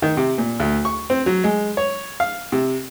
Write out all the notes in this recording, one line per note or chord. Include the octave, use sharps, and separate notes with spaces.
D#3
C3
A#2
D2
C#6
C4
F#3
G#3
C#5
F5
C3